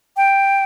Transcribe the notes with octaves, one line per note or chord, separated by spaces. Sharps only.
G5